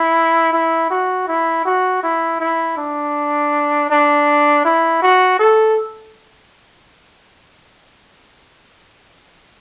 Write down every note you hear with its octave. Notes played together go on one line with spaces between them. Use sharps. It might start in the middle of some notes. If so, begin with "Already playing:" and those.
Already playing: E4
E4
F#4
E4
F#4
E4
E4
D4
D4
E4
F#4
A4